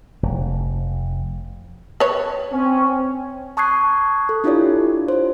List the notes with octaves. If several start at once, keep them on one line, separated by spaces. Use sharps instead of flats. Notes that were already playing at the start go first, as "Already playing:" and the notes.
F1
B4 C#5
C4 C#4
A5 C#6 D#6 F#6 G#6 C7
A4
D4 E4 F4 G4 C#5 D5
F4 C5